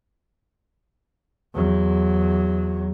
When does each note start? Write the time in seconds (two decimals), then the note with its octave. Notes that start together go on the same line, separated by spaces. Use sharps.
1.54 E2 F#3